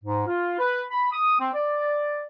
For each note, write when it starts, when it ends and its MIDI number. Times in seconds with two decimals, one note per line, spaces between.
0.04 0.22 44
0.26 0.58 65
0.59 0.82 71
0.90 1.11 83
1.11 1.38 87
1.39 1.49 60
1.54 2.24 74